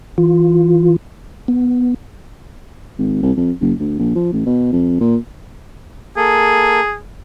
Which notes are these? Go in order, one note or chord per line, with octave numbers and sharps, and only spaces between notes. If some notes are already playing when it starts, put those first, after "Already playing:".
E3 F4
B3
G#1
C2
F2
F#1
D2
A#1
F3
A1
B2
F2
A#2
A#3 G#4 A4